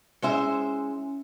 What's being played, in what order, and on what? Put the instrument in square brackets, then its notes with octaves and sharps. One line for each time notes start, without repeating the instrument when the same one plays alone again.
[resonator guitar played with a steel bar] G#3 C5 E5 [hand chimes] C#4 E4 C#7